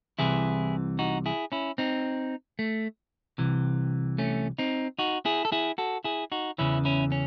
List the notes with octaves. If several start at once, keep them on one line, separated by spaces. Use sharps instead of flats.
C2 C3 E3 E4 G#4
D#4 F#4
E4 G#4
C#4 E4
C4 D#4
A3
C2 C3 E3
A3 C#4
C4 D#4
D#4 F#4
E4 G#4
A4
E4 G#4
F#4 A4
E4 G#4
D#4 F#4
E2 C#3 E3 C#4 E4
C#4 E4
C#4